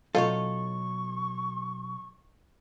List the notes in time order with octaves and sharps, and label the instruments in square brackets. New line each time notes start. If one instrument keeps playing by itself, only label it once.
[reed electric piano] B2 F#3 [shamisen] D#4 F4 [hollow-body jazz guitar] A4 C#5 [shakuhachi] C#6